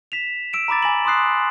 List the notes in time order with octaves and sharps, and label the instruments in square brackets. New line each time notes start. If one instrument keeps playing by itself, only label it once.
[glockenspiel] B6 E7 F7
E6 D7 E7
A#5 B5 D6 A6
G#5 A#6 F#7
C6 D6 D#6 F#6 C7